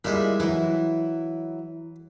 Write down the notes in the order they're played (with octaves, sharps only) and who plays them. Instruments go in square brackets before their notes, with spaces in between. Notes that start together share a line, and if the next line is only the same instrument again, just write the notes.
[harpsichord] A#2 G3 G#3 [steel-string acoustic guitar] E4 E5
[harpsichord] E3 [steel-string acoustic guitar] F#3 E4